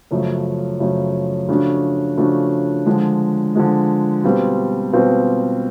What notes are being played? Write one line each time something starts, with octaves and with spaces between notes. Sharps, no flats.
F#2 C#3 F3 A3
F#2 C#3 F3 A3
C#3 F3 A3 D4 F#4
C#3 F3 A3 D4 F#4
D3 F3 G#3
D3 F3 G#3
B2 G3 C4 F4
B2 G3 C4 F4